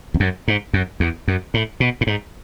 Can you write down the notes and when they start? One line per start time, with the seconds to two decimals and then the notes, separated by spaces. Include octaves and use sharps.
0.14 E2
0.20 F#2
0.48 G#2
0.73 F#2
1.00 E2
1.28 F#2
1.54 A2
1.80 B2
2.01 A2
2.07 G#2